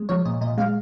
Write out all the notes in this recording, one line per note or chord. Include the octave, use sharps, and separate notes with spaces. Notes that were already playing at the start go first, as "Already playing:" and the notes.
Already playing: G#3
F3 C#5
A#2 D#5
A#2 D#5
G#3 F5